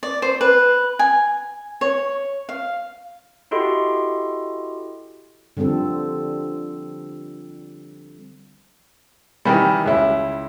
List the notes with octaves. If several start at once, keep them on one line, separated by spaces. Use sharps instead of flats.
D5
C5
B4
G#5
C#5
F5
E4 F#4 G4 A4 D#5 C6
D3 F3 G3 C4 A4
D#3 E3 G3
C#2 E4